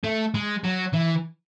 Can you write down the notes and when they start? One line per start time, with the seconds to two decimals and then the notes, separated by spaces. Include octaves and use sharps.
0.04 A3
0.34 G#3
0.64 F#3
0.93 E3